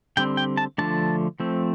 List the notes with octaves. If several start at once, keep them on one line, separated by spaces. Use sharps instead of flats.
D3 G3 C4 G5
G5
A5
D3 F3 A3 D4 A5
F3 A3 C4